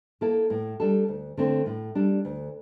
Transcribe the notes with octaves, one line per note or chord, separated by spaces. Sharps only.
A#3 E4 A4
A2
G3 D4 A4
D2
D3 A3 C4
A2
G3 D4
D2